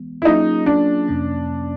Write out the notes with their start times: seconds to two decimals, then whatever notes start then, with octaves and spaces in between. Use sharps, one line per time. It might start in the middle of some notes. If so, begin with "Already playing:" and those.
Already playing: E3 G#3 B3
0.22 E4
0.25 F#3 A#3 C#4 D#4 F4 G#4
0.66 D4
1.08 F2 C3 F3 A#3 C#4